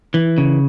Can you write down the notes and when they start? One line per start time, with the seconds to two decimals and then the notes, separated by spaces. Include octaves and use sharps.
0.14 E3
0.38 C#3